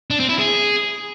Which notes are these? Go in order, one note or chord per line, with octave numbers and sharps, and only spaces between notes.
D4
C4
E4
G#4